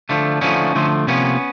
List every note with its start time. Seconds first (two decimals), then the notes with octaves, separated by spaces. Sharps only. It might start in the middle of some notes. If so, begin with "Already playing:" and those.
0.09 D3 F3 A3
0.41 D3 F3 A3 C#4 D#4
0.75 D3 F3 A3
1.07 C3 F3 A#3 B3 C#4